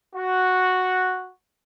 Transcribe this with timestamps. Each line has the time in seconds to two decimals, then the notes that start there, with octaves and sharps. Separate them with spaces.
0.15 F#4